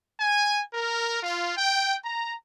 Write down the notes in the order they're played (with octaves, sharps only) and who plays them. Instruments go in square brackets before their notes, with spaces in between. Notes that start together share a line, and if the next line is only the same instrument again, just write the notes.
[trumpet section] G#5
A#4
F4
G5
A#5